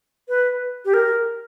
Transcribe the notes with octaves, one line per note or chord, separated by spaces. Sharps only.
B4
G4
A#4